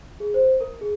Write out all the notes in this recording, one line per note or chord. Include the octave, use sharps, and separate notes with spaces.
G#4
C5
A#4
G#4